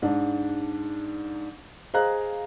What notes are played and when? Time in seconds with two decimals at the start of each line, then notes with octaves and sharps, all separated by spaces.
0.02 G#2 D4
1.94 G#4 C5 D#5 F5 A#5 F#6